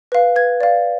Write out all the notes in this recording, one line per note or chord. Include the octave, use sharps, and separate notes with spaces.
B4 F5
B4 G#6
D5 F5